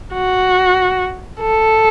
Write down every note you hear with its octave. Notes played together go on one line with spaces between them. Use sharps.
F#4
A4